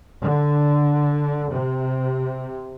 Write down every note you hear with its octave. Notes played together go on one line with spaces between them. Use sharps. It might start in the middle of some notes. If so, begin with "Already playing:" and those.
D3
C3